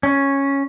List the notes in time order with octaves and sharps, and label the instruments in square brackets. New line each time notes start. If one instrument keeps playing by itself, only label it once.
[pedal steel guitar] C#4